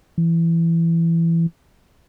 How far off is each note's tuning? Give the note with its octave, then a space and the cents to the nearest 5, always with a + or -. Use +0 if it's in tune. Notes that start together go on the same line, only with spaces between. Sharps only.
E3 +15